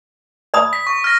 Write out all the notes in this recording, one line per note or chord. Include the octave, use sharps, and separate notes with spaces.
D5 B5 D#6
B6
C#6
F6 A#6